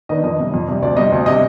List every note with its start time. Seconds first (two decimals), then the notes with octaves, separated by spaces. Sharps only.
0.09 D#3 B3 D4 D#5
0.24 F2 D#5
0.39 C3 G3
0.54 F2
0.68 C3 G3
0.82 D2 D5
0.97 C3 G3 D#5
1.12 D2
1.26 C3 G3 D#5